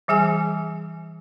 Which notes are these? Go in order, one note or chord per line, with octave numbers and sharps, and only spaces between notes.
E3 G3 G#4 G#5